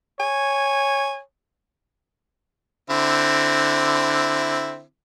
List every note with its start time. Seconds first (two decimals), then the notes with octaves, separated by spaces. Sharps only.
0.20 C#5 G#5
2.90 D3 C4 E4